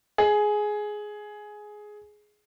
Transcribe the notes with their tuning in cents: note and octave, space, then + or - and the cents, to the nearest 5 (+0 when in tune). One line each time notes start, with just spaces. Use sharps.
G#4 +10